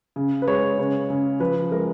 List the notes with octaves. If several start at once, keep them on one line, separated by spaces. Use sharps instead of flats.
C#3
B4
G#3 C#5
C#3 C#5
C#3
F3 B4
G#3 A#4